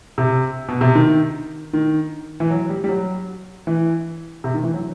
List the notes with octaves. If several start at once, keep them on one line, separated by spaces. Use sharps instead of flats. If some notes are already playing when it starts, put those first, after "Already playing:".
C3
B2
C3
D#3
D#3
E3
F#3
G3
G3
F#3
E3
C3
D#3
E3
F#3